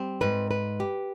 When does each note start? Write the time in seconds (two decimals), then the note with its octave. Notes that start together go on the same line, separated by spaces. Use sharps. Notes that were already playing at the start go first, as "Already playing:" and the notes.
Already playing: G3 C4
0.21 G#2 B4
0.51 B4
0.80 G4